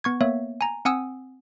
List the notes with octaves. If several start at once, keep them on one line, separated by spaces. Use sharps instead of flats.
B3 C#6 G#6
A#3 B3 C#5 E5
G#5 A#5
C4 F#5 G#5 D#6 E6